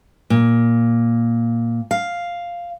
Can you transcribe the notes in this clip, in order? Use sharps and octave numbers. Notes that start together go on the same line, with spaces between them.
A#2
F5